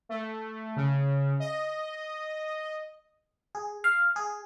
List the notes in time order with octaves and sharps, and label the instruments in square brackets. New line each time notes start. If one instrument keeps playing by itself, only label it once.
[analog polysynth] A3
C#3
D#5
[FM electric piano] G#4
F5
G#4